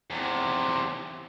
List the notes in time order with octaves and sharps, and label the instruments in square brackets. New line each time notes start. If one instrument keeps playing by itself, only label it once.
[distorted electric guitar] E2 C3